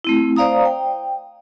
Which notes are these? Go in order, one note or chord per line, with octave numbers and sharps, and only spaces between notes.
A3 C4 E4
C5 D5 F5 A#5 D#6
G5